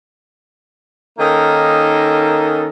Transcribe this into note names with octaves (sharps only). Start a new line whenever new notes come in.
D#3 A#3 C#4 D#4 A4 D#5